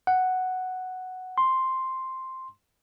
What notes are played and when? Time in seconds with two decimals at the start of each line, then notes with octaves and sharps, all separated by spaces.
0.07 F#5
1.38 C6